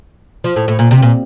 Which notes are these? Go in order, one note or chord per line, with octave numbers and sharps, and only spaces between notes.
F3
A2
A2
A#2
C3
A#2